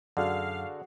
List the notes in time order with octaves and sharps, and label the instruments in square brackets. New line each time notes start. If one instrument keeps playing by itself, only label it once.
[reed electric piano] F#2 [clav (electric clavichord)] D3 [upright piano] F#4 G#4 D5 [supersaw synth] F5